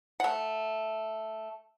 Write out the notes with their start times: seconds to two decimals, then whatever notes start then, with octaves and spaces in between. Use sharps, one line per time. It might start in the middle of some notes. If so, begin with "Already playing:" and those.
0.20 A3 F#5